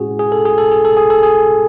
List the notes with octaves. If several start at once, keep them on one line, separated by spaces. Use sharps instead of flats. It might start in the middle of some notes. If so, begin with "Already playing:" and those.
Already playing: A2 G#3 C#4 E4 F#4 G#4
G#4
A4
G#4
A4
G#4
A4
G#4
A4
G#4